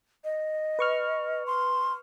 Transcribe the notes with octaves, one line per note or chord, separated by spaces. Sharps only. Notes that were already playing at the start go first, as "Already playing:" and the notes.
D#5
B4 C#6 F6
C6